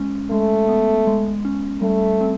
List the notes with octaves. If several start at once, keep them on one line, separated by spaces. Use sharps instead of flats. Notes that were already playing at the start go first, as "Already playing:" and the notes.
Already playing: G#3 C#4
G#3 A3
B3
G#3
C#4
G3 A3
C4